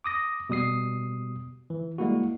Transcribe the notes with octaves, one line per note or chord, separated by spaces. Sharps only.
D6 D#6 A#6
B2 G3 D#6 C7
E3
G3 G#3 A#3 E4 F#4